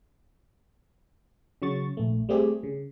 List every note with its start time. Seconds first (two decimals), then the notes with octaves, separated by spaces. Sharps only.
1.62 C#3 F#3 C#6 A6
1.97 A#1 A3
2.29 G3 A3 C4 G4 G#4
2.63 C#3